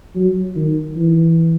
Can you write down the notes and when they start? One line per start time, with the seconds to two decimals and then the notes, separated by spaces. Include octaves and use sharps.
0.16 F#3
0.56 D#3
0.97 E3